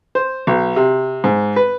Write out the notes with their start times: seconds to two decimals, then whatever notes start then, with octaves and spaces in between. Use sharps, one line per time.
0.15 C5
0.47 B1
0.76 C3
1.24 G#2
1.56 B4